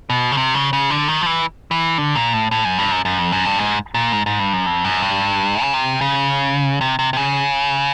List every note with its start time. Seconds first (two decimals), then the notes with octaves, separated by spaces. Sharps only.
0.10 B2
0.32 C#3
0.37 C3
0.54 C#3
0.73 C#3
0.90 D3
1.08 D#3
1.21 F3
1.26 E3
1.71 E3
1.98 D3
2.16 A#2
2.33 A2
2.51 A2
2.65 F#2
2.78 G2
2.92 F#2
3.05 F#2
3.18 F2
3.32 F#2
3.45 G2
3.59 G#2
3.94 A#2
4.13 G#2
4.26 G#2
4.39 G2
4.53 F#2
4.66 F2
4.84 F#2
5.02 G2
5.62 C#3
5.74 C3
6.01 C#3
6.81 C3
6.99 C3
7.13 C3
7.17 C#3